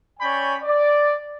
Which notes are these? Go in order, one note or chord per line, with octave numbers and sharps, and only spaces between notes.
C#4 C#5 D5 G5 G#5 B5
D5